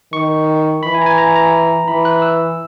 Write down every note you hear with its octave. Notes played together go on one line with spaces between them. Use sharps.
D#3 C#6
E3 B5
G#5
A#5
G#5
A#5
A#5
E3 B5
F#6
E6